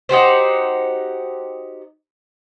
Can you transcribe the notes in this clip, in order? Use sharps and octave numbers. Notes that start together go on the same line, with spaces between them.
D#4 F#4 G4 C5